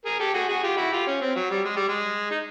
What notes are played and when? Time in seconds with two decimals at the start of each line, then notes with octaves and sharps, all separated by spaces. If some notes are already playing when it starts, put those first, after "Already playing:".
0.05 G#4 A#4
0.20 G4 A4
0.34 F#4 G#4
0.48 F#4 G#4
0.63 F4 G4
0.77 E4 F#4
0.91 F4 G4
1.07 C#4
1.21 C4
1.35 F#3
1.50 G3
1.65 G#3
1.76 G3
1.88 G#3
2.31 D#4